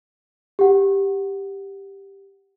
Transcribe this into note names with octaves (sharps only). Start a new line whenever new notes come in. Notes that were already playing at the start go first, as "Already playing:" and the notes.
G4 F#5